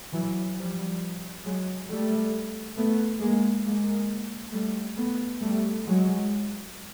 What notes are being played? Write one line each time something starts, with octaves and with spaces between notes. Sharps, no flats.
E3 F#3
F3 G3
F#3 G#3
G3 A3
A3 B3
G#3 A#3
G#3 A#3
G3 A3
A3 B3
G3 A3
F#3 G#3